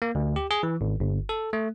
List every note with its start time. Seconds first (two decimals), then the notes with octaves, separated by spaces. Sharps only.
0.02 A#3
0.15 D2
0.36 G4
0.51 G#4
0.63 E3
0.81 G#1
1.00 G1
1.29 A4
1.53 A3